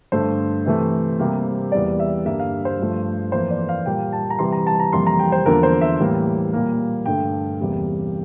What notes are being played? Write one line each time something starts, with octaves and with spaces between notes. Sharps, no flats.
G2 D3 A3 C5
C3 E3 A3
C3 G3 A#3
E2 E3 G3 A#3 D5
E5
G2 D3 G3 A#3 E5
F5
C5
G2 F3 A3
F2 E3 A#3 C5
D5
F5
A#2 G3 A#3 G5
A5
A#5
C3 E3 G3 C6
A#5
A5
A#5
F2 C3 E3 G3 A#3 C6
A#5
G5
C5
E2 D3 F3 A#3 A#4
C5
E5
A2 E3 G3 A#3
A#2 G3 A#3
G2 D3 A3 G5
E2 C3 G3 A#3